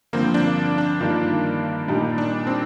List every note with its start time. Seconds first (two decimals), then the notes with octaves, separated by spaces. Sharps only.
0.13 G2 D3 F3 A#3 C4
0.34 D4
0.78 D4
1.00 G2 D#3 A#3 F4
1.88 A#2 G3 A#3 D4 D#4
2.18 D4
2.47 C4